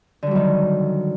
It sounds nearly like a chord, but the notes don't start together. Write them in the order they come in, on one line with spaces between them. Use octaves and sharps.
D3 G3 F#3 D#3